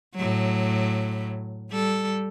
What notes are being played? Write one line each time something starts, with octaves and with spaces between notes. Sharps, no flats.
A2 F#3
G3 A4